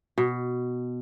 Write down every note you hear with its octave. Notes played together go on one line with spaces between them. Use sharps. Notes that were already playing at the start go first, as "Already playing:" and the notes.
B2